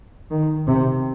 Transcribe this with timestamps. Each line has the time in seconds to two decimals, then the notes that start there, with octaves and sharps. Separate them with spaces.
0.31 D#3
0.68 C3